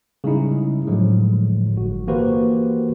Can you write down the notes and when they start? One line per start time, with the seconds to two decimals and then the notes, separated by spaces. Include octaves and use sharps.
0.24 C#3 G3 G#3 D#4 E4
0.87 A2 D3 F3 F#3 G#3
1.76 G1 F#4
2.08 E3 A#3 F#4 G4 B4 C5